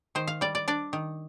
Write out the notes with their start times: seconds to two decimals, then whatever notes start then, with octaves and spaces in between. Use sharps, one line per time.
0.15 D#3 C5
0.27 F5
0.41 G3 D5
0.55 D5
0.68 D4 D5
0.93 D#3